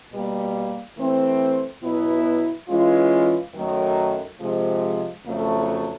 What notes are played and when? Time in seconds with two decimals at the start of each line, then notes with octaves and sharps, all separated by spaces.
0.11 B2 G3 A#3
0.97 E3 A3 C4
1.83 B2 F#3 B3 E4
2.69 E3 G#3 C#4 F4
3.53 F#2 D#3 F#3 A3
4.40 C3 F3 G#3
5.26 F2 C#3 F#3 A3